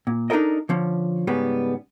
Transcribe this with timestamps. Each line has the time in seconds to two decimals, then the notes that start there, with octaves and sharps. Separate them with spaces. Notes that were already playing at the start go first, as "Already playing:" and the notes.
0.07 A#2
0.30 D4 D#4 G4 A4 A#4 D#5
0.69 D3 F3 C#4
1.27 G#2 C#3 G3 G#3 B3